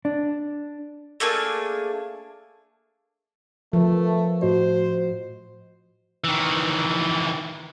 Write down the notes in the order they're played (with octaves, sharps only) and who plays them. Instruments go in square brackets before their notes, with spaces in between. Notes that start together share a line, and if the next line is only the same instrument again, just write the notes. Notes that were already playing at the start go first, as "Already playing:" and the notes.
[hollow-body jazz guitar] D4
[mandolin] A3 A#3 D4 G#4
[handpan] F3 [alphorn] A3 [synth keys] A#4 B4
[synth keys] A2 F#4 D#5 [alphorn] C5
[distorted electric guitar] D#3 E3